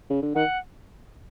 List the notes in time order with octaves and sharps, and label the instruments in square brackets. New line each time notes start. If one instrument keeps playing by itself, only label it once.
[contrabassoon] C#3
D3
[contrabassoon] D#3 [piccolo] F#5